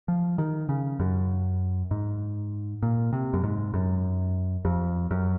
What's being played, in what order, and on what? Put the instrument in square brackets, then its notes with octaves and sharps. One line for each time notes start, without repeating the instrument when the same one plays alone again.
[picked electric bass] F3
D#3
C#3
F#2
G#2
A#2
C3
F#2
G#2
F#2
F2
F#2